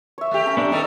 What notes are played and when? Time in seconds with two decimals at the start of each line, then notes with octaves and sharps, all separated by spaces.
0.18 C#5 E5
0.31 A3 G4
0.46 C#4 A#5
0.57 B3 D4
0.72 G3 C#4 D#4 A4 D5